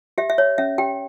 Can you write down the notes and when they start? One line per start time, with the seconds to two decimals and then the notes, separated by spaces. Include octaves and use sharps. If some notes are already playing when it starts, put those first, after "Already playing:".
0.18 G4 E5
0.30 E5
0.38 C#5
0.58 C#4 E5
0.78 G4 G5